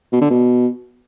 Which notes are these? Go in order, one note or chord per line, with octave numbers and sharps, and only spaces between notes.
B2
D3
B2